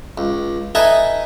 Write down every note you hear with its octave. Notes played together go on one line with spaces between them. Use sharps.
C#2
D#4 A4 B4 D#5 E5 G#5